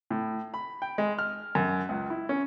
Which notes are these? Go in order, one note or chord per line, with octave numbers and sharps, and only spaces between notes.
A2
B5
G5
G#3
F6
F#2
C#2
E4
C#4